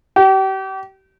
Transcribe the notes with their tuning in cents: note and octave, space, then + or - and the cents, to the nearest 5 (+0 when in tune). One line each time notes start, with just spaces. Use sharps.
G4 -35